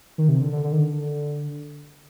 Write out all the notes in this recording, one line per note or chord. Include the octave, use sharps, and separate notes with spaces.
D#3
C3
D3
D3
D3
D#3
D3